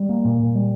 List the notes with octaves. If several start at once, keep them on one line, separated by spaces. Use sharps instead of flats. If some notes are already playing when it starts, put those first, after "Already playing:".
Already playing: G3
A#3
A#2
A#2
G3